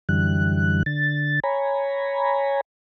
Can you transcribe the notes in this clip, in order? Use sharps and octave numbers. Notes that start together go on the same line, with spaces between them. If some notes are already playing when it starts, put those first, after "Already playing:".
F#2 D3 E3 G3 F#6
D3 A6
C#5 G#5 A#5 B5